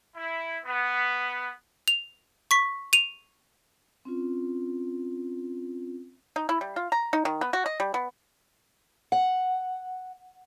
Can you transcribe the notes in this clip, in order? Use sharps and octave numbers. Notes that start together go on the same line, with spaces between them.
E4
B3
F7
C#6 B6
D#7 F7
C4 C#4 F4
D#4
E4
G3
F4
A#5
D#4
D#3
B3
F#4
D#5
G3
B3
F#5